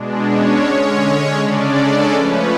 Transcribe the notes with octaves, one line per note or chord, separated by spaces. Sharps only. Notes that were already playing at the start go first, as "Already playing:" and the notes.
Already playing: B2 G#3 D4
C#4 C#5
D3 G#3 C#4
C#3 G#3 C#4 D4 D5
A4
F3 A3 C#4 B4